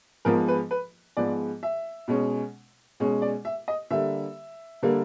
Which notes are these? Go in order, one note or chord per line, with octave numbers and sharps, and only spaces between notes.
G#2 F3 G#3 B3 A#4
B4
B4
G#2 F3 G#3 B3 D5
E5
B2 G#3 C#4
B2 G#3 C#4
D5
E5
D#5
D3 G3 A#3 E5
D3 G3 A#3